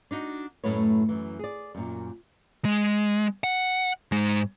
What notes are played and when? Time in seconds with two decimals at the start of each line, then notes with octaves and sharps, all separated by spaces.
0.11 D4 D#4 F#4
0.64 F#2 A2 A3 E4 B4 C#5
1.09 F#2 E3
1.39 G#4 D5
1.75 F#2 A#2
2.65 G#3
3.44 F#5
4.12 G#2 G#3